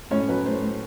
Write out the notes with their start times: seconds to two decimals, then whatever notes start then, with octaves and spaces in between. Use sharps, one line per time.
0.11 A2 C#4 C#5
0.28 F#3 B4
0.45 A2 C5
0.63 A2